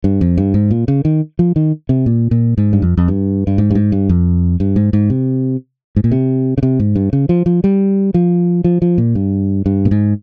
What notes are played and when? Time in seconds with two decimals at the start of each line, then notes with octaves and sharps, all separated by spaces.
0.04 G2
0.21 F2
0.38 G2
0.54 G#2
0.71 A#2
0.88 C#3
1.05 D#3
1.39 F3
1.56 D#3
1.89 C3
2.06 A#2
2.31 A#2
2.58 G#2
2.73 G2
2.82 F2
2.97 F2
3.08 G2
3.47 G2
3.58 G#2
3.70 G2
3.75 G#2
3.92 G2
4.09 F2
4.60 G2
4.76 G#2
4.93 G#2
5.10 C3
5.96 G#2
6.04 A#2
6.11 C3
6.58 C#3
6.63 C3
6.80 G#2
6.96 G2
7.13 C#3
7.29 F3
7.46 F3
7.64 G3
8.14 F3
8.64 F3
8.82 F3
8.98 A#2
9.15 G2
9.66 G2
9.85 A#2
9.91 G#2